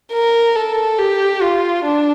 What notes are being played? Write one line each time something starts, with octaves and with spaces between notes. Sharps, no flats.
A#4
A4
G4
F4
D4